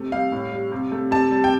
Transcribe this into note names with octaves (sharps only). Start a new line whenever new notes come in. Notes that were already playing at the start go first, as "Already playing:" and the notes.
Already playing: C3 A3
G3 F5
A2
G3
C3
A3
C3 A5
G3
G5